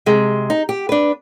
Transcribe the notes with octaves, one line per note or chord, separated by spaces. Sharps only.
C3 G#3
D#4
G4
D4 B4